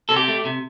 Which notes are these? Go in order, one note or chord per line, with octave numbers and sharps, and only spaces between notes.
C3 A4
G4
A3
C3